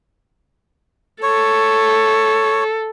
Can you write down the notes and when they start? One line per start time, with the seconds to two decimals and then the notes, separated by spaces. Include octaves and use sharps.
1.23 A4 C#5